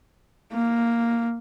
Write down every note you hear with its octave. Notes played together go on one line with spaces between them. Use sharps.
A#3